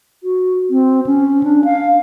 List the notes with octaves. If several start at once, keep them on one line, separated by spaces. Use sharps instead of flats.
F#4
C4
C#4
D4
F5